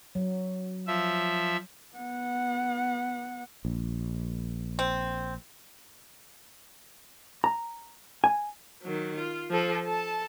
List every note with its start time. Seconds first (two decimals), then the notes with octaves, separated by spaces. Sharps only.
0.15 F#3
0.87 F3 E5
1.96 B3 F#5
3.65 A#1
4.79 C4
7.44 A#5
8.24 G#5
8.82 D#3 F#3
9.18 F4
9.51 F3 A4
9.85 A4 A5